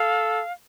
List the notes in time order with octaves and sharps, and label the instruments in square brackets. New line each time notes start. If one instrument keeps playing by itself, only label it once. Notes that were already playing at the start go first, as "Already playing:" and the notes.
Already playing: [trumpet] A4 [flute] F5